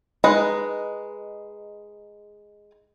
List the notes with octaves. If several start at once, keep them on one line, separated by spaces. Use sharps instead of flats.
G#3 D#4 B4 D#5